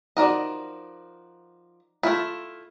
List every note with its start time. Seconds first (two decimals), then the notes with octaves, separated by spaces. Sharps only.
0.17 F3 D#4 F#4 A#4 D5 D#5
2.03 A3 E4 F4